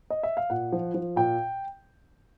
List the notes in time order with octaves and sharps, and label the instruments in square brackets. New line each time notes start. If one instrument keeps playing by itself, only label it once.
[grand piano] D#5
E5
F5
A#2 F#5
F3
F3
A#2 G5